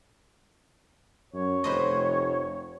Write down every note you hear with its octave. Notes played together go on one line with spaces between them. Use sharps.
F#2 C#5
F1 B4 C5 D#5